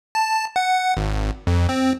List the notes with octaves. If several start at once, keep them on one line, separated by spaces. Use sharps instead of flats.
A5
F#5
G#1
F2
C4